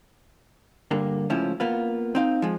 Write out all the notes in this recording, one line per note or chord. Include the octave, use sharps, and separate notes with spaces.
G2 D3 A#3
C#2 A2 F3 C#4 E4
A#3 B3 F4
C4 D#4 F5
F3 G#3